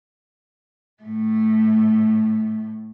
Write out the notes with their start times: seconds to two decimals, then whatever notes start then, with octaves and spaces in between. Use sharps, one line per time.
1.03 A2 A3